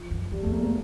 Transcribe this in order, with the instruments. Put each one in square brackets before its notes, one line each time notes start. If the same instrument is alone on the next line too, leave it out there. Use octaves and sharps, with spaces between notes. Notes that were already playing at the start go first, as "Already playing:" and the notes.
Already playing: [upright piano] F3
[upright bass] F#2
[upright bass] F2 [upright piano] G3
[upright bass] F2 [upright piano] A3
[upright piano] A#3
A3
A#3